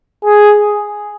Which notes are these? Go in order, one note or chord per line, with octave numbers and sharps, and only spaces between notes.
G#4